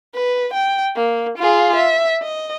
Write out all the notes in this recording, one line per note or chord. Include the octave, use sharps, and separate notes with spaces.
B4
G5
A#3
F4 G#4
E5
D#5